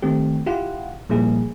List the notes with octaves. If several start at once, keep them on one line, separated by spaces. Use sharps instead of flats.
D#3 A3 C4 G4
E4 F4 G4 F#5
A#2 F3 G3 A#3 E4 G#4